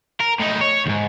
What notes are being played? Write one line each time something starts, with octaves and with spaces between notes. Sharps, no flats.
A#4
A2 D#4
C#5
D2 G#2